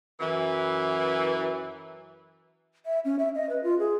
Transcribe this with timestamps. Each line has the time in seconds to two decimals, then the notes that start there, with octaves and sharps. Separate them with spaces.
0.20 F#2 E3
2.86 E5
3.05 C#4
3.19 E5
3.35 D#5
3.49 B4
3.63 F4
3.79 G#4